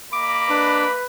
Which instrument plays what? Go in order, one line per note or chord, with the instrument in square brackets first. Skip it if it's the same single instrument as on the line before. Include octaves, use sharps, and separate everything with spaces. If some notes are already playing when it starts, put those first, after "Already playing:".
[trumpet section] A#3 D#5 B5 [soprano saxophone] D6
[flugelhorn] D4 [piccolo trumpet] B4